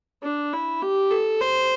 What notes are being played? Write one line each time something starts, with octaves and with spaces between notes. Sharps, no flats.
D4
E4
G4
A4
C5